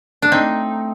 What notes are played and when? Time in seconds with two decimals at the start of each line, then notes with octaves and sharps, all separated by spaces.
0.22 D4
0.32 A3 C4 D#4